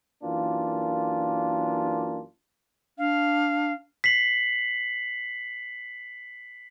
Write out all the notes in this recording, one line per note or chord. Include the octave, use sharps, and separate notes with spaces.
F#2 E3 A#3 D4 F4
D4 F5
B6 C7 F#7